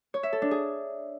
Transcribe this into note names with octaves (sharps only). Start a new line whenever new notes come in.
C#5
E5
A4
D4
G#4